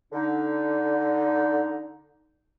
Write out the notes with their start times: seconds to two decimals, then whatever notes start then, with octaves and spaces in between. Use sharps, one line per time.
0.13 D3 D#4